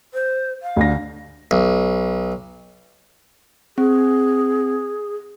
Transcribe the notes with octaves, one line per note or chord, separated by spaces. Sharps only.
C5
F5
D2 D3 A#6
B1
C4 G#4